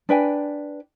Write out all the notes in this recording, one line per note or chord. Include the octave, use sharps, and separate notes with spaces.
D4 B4 G5 G#5